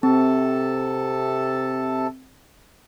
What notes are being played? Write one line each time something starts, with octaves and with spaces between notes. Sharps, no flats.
C3 C4 A4 A5